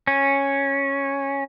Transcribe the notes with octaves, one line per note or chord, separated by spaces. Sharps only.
C#4